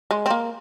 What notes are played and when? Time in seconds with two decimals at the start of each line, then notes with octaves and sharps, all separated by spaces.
0.11 G#3
0.26 C4
0.30 A#3